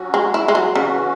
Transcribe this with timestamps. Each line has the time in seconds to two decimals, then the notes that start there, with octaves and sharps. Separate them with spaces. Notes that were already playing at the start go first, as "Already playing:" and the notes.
Already playing: F#3 C#4 F#4
0.14 G#3
0.34 E4
0.48 G#3
0.55 F#3
0.75 C#3 E3 C#4 F#4